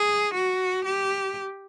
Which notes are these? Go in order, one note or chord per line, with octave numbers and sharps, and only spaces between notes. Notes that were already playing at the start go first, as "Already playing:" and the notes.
Already playing: G#4
F#4
G4